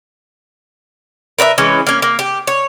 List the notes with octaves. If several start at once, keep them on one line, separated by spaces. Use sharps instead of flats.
A#4 B4 D5 E5
E3 G#3 C#4
A#3 C#4
A#3
G4
C#5